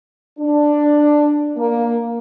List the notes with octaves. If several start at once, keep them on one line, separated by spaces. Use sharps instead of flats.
D4
A#3